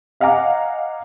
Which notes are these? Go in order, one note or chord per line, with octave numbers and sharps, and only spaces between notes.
D#5 F5 F#5 G#5 A#5 D6